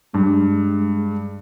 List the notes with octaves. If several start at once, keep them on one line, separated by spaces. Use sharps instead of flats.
G2 G#3